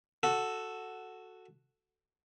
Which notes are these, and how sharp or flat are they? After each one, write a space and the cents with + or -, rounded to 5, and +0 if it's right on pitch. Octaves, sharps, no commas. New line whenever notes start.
F#4 +0 A4 +0